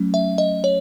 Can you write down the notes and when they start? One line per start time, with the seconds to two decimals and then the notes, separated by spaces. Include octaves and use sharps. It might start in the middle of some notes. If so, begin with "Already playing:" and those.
Already playing: F#3 A3 C#4
0.14 E5
0.38 D#5
0.64 C#5